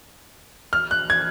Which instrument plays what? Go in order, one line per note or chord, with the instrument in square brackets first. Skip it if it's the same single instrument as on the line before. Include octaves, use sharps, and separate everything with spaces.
[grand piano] F6
F#6
G#6